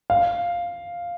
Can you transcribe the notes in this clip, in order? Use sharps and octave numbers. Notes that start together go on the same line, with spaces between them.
F5